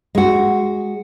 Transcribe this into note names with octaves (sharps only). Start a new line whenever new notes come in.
G#3 F#4